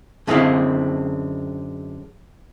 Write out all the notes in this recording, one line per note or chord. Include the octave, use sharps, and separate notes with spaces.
F#2 D3 G#3 C4 E4 F5